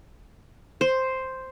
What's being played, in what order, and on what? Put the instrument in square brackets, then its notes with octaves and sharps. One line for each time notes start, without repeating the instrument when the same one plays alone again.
[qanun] C5